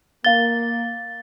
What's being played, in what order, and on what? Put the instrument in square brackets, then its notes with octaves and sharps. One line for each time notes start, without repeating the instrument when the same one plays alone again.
[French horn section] A#3 [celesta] F5 G7 [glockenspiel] A6